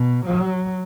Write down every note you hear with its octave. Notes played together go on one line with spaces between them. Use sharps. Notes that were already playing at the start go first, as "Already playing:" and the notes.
Already playing: B2
F#3